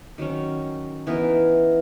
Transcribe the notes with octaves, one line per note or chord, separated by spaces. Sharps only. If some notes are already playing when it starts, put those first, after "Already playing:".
D#3 F#3 C#4
E3 B3 D#4 A#4